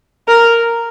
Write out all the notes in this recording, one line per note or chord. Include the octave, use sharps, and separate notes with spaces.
A#4